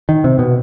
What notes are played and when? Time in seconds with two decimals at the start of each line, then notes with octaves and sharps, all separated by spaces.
0.09 D#3
0.24 C3
0.39 B2